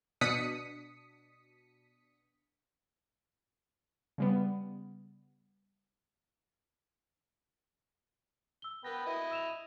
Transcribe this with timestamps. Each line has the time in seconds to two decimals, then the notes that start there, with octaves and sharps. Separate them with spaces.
0.21 B2 D4 D#6 B6 C#7
4.18 C#3 G3 B3
8.62 E6 G7
8.84 B3 A#4 B4 G5 A#6
9.06 E4 D#5
9.31 E6 E7 F7